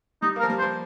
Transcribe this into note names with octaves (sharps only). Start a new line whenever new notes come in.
G3 D#4
A#3 A#4
F3
G3
C5
F3